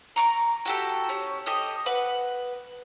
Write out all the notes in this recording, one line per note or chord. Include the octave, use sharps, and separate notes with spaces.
A#5 C#6 D6
F#4 G4 A4
C#4
G4 A4 D#5 D#6
B4 F#5